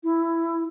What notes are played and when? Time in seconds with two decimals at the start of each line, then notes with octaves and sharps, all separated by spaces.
0.03 E4